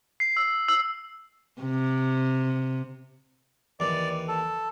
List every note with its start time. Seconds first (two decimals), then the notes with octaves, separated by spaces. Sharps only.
0.20 C7
0.37 E6
0.69 E6
1.62 C3
3.80 D#2 E3 D5
4.28 A4